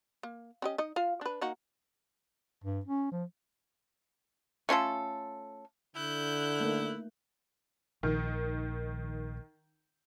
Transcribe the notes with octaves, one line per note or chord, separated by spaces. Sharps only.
A#3
C#4 G4 D#5
D#4 D#5
F4 F5
D4 B4
A#3 D#4 F#4
G2
C#4
F3
A3 C#4 F4 A4
D3 E4 F#6 G6
A3 A#3 D#4
A#1 D#3